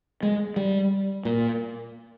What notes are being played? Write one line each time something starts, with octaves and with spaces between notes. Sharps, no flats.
G#3
G3
A#2